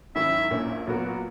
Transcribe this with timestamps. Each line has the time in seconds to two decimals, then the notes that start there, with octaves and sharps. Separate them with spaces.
0.15 G#2 D#3 F#3 C#4 E4 E5
0.51 A#1 A#2 A#3 C#4
0.87 A#2 F#3 B3 F#4 A#4